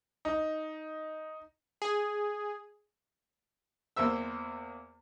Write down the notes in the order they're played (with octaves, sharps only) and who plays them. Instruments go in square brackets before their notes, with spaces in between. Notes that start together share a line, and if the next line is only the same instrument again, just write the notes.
[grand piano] D#4
[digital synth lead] G#4
[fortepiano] E2 A#3 C5 E5 E6